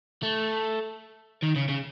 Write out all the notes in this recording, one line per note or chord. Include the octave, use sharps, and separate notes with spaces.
A3
D#3
C#3
C#3